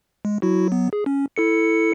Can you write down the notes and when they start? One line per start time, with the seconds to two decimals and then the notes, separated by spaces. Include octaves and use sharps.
0.25 G#3
0.42 F#3 E4 F#4
0.69 F#3 B3
0.93 G#4
1.06 C#4
1.36 E4 A4 C#7